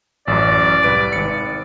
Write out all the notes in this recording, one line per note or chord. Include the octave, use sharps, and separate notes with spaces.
A1 F#2 D5
C2 B4 D7
G#1 C#7